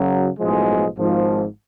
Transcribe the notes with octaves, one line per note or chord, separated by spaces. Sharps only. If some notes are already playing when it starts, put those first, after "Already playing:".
Already playing: F#2 C#3 F#3
B1 A2 F3 G#3
G#1 G#2 F3